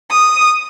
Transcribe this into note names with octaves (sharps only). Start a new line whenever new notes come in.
D#6